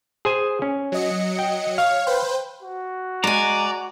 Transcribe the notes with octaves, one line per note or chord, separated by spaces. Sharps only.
G#4 C5 G#5
C#4
F#3 D#5 C#7
G5
C#5 F5
B4 C5 G5
F#4
G#3 D5 G#5 A#5